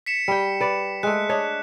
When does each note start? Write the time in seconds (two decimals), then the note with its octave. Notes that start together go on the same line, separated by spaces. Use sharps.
0.06 B6 C#7 E7
0.28 G3 G5
0.60 B4 D5
1.03 G#3 A3 F#6
1.29 D4 C#5 D#5